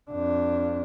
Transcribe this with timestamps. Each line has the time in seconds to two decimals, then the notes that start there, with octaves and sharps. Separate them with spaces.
0.11 F2 D4